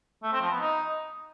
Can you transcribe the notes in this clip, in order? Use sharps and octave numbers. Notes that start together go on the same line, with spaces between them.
A3
C4
F3
B3
D#4